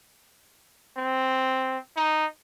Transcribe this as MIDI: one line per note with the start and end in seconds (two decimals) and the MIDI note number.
0.97 1.78 60
1.97 2.26 63